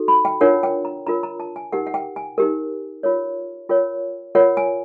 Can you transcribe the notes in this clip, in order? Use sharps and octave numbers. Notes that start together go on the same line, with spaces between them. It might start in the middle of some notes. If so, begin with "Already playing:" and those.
Already playing: D#4 F#4 A4
B5
G5
D4 F4 A#4 C#5 F#5
G5
A#5
D4 F4 A#4 C#5 A#5
A#5
A5
G#5
D#4 G4 A#4 F#5
F#5
G5
G#5
D#4 G4 A#4
F4 A#4 C#5
F4 A#4 C#5 G5
F4 A#4 C#5 F#5
G#5